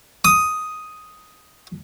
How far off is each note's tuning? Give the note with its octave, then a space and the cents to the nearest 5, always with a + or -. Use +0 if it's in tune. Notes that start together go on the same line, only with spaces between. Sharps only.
D#6 +5